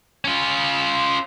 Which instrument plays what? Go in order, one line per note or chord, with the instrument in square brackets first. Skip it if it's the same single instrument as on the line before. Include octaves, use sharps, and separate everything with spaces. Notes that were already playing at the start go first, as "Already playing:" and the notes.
[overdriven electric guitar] C#4 F4